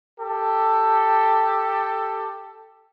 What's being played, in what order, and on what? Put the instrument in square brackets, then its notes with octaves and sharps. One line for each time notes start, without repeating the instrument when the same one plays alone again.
[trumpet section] G4 A4